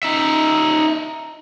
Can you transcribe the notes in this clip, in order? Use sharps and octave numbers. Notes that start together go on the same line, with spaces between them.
D#4 E5